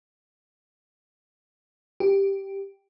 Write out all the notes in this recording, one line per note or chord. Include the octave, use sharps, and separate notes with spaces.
G4